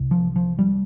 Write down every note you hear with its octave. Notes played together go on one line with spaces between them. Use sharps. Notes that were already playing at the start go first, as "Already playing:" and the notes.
Already playing: C2 C3
F3
F3
G3